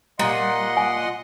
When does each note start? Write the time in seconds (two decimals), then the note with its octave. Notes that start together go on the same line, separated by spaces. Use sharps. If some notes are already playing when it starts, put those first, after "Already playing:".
0.19 A#2 G3 D#5 F#5 C6
0.77 G#5